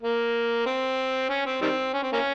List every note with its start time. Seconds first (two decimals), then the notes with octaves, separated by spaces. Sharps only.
0.03 A#3
0.66 C4
1.29 C#4
1.46 C4
1.61 D#3 G3 C4
1.94 C#4
2.03 C4
2.13 A#3 C#4